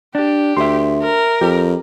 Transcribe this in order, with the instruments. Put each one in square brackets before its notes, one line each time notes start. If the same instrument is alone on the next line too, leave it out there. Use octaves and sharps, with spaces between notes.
[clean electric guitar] D4 [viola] G4
[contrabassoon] D2 [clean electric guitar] E5 C6
[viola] A#4
[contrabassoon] F2 [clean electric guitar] G4